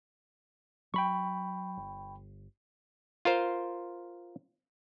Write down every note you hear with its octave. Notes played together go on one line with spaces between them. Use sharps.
F#3 G5 B5 C#6
G1
F4 A#4 C5